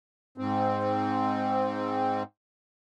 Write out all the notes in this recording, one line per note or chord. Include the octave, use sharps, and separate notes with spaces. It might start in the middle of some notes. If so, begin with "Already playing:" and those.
G#2 C4